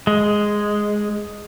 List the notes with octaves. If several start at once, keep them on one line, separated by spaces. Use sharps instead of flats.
G#3